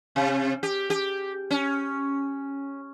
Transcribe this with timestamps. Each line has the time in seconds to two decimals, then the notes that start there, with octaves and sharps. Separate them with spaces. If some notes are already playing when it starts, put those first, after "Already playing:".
0.16 C3
0.63 G4
0.90 G4
1.51 C#4